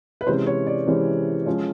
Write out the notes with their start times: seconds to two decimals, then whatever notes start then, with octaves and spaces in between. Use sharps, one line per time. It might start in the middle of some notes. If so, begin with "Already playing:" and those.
0.21 B4
0.27 C3 E3 G#3 C#4 C5
0.47 C#5
0.67 D5
0.87 C3 E3 G#3 C#4
1.46 F3 G#3 C#4